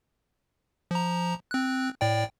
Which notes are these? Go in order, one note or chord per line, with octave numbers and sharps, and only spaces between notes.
F3 A#5
C4 F#6
A2 D5 G5